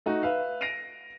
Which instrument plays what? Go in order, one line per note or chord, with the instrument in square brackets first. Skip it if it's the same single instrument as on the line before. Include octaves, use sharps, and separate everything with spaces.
[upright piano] A3 D#4 F#4
B4 E5 F5
A#6 C7 D7 D#7 F7